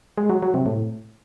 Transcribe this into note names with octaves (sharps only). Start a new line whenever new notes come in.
G#3
F#3
F#3
C3
A2